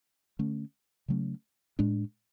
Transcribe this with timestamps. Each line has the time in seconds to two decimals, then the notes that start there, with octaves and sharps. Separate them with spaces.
0.39 D3 A3 C#4
1.08 C#3 F#3 A3 C#4
1.79 A2 G#3 D4